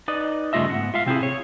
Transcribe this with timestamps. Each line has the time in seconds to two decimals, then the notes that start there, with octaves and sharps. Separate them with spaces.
0.08 D#4 B4 D5 D#5
0.53 G2 C#3 A3 F4 D#5 E5
0.70 G#2 B3 F#5
0.94 F4 E5 F5
1.06 C3 C4 E4 G#4
1.23 C#5